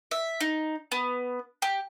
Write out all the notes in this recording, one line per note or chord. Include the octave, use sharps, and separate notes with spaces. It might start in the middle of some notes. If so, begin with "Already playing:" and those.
E5
D#4
B3
G4